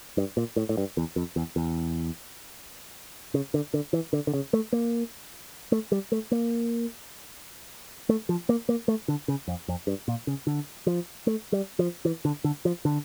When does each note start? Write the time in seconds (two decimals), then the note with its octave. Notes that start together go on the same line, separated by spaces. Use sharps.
0.17 G2
0.37 A#2
0.56 A2
0.69 A2
0.77 G2
0.97 E2
1.16 F2
1.36 E2
1.56 E2
3.34 C#3
3.54 D3
3.74 D3
3.93 E3
4.13 D3
4.27 D3
4.34 C#3
4.53 A3
4.73 A#3
5.72 A3
5.92 G3
6.12 A3
6.32 A#3
8.09 A3
8.29 F3
8.49 A#3
8.69 A#3
8.88 A3
9.08 D3
9.28 C#3
9.48 F2
9.68 F2
9.87 G2
10.08 A#2
10.27 C#3
10.47 D3
10.87 F3
11.27 A3
11.52 G3
11.79 F3
12.05 E3
12.25 D3
12.44 D3
12.65 F3
12.85 D3